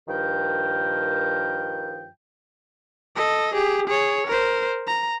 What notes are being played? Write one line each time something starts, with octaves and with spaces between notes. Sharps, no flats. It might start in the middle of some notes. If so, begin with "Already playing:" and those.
G2 D#3 F3 A#4 G5
A4 D#5
G4 G#4
G#4 C#5
A#4 C5
A#5